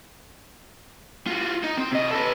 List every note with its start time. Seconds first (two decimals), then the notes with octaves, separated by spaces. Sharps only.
1.27 F4 F#4
1.63 D#4
1.78 C4
1.91 C3 D#5
2.11 A4 B4